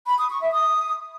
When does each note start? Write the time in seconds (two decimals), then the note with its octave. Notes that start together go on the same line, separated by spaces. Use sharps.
0.06 B5
0.18 D#6
0.30 C#6
0.41 E5
0.53 D#6